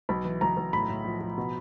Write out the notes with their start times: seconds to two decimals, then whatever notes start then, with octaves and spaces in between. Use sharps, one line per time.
0.09 B1 B5
0.25 E3
0.41 B1 A#5
0.57 B1
0.73 A2 B5
0.89 A2
1.05 F3
1.21 F3
1.38 B2